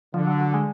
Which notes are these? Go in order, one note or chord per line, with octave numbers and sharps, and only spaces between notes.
D3 F3
F#3
F#3
G#3